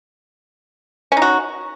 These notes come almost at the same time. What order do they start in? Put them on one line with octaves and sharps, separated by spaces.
C#4 D#4 F#4